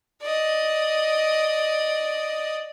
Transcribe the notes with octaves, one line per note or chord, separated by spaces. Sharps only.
D5 D#5